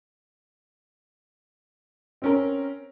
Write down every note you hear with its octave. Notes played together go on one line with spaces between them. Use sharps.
C4 C#4 A#4